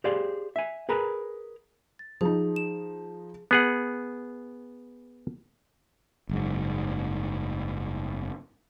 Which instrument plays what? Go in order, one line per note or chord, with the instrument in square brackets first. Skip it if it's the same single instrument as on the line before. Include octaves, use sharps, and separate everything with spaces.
[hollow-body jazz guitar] G4 G#4 C5 D5 F5
E5 G#5
G#4 A#4 B4 G#5 A#5
[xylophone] A6
[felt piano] F3 D#4 [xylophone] G#4
[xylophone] E7
[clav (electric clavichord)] B3 G#4 F#5
[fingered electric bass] F#1 G#2